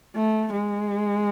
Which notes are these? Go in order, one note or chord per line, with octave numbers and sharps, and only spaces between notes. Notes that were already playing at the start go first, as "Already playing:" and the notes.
A3
G#3